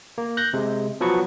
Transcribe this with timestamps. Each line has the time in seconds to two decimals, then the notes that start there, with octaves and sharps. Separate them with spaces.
0.18 A#3
0.37 F#6 G6 A#6
0.53 C3 G#3
1.01 F3 F#3 B3 B4 C#6